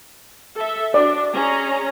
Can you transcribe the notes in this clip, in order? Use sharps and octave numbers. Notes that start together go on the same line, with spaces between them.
A4 E5
D4 F#4 D5
C#4 G#4 A#5